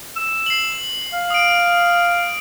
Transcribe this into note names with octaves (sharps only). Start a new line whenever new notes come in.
E6
C7 F#7
F5
D#6 D7